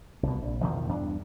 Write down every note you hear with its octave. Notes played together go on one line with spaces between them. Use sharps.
C2 B2
A#1
E2 B2 D#3 F3
E2 G2 D4